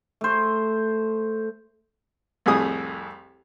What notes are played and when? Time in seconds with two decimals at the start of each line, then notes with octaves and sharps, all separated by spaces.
0.21 A3 C5
2.46 C2 F2 A2 G#4 D#6